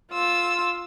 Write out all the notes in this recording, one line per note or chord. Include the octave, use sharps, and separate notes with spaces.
F4 E6